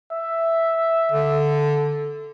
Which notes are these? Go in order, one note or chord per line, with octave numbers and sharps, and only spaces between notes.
E5
D3